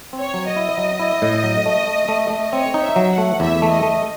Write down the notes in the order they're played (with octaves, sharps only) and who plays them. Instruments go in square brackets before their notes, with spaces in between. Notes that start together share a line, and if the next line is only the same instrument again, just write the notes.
[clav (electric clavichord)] C4
[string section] C#5
[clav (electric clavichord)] F#3
[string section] D#5
[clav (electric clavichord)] E4
F#3
E4
A2
F#3
A3
A3
A3
A3
[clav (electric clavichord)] C4 [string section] C#5
[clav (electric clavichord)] D#4
[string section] E5
[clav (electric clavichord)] F#3
[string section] F#5
[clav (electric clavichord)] A3
[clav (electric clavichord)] E2 [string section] E5
[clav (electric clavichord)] A3
[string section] D#5
[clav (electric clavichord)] A3